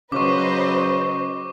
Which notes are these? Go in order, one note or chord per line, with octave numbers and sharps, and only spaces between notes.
C#3 F#3 B4 C5 D#5 C#6 D6